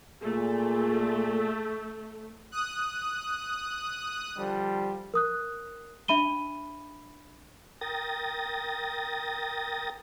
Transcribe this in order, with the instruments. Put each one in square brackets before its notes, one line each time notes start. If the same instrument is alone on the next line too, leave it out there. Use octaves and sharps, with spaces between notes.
[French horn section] A#2 G#4 [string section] A3
[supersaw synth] D#6 F#6
[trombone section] D3 F3 G3
[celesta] A#4 D#6 F#6
D4 E5 B5 D#7 G7
[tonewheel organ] A#4 G5 D#6 A6 A#6